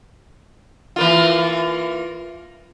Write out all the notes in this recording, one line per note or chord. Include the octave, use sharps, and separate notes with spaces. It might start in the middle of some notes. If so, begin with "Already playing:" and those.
E3 A#3 F4